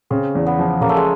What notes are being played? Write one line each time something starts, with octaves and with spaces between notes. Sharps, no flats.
C#3 C4
E2
B3
F3
C#3 A#3
A3
G#3